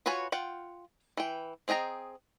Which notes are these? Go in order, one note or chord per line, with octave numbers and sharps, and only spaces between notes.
F4 F#4 B4 C#5 G#5
F4 F#5 G5
E3 G5
C4 G#4 D#5 G5 A#5